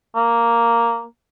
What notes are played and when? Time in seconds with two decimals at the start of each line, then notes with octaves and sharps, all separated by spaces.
0.15 A#3